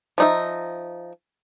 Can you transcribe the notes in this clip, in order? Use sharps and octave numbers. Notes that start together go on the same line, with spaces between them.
F3 D#4 E5